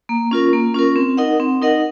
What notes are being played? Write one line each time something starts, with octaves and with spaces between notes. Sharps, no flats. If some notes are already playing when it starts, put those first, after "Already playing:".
A#3
C#4 F4 A#4
A#3
C#4 F4 A#4
C4
D#4 A#4 D#5 F#5
C4
D#4 A#4 D#5 F#5